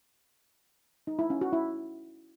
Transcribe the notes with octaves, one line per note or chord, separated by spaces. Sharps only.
D#4
E4
C#4
F#4
E4